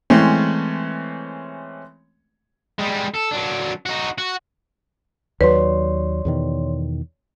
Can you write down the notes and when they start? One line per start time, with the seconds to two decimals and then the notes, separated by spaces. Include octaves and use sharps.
0.10 E3 G#3 A3 C4 C#4
2.79 G3 G#3
3.14 A4
3.31 F#3 D4
3.86 D#4 F#4
4.18 F#4
5.41 D#2 F#3 B4 C#5 D5 C6
6.25 E2 B2 D#3